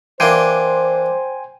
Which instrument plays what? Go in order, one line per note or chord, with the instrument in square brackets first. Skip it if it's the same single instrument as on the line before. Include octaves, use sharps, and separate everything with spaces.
[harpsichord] E3 A#3 D4 [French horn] C5 [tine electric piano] G5 G#5 C6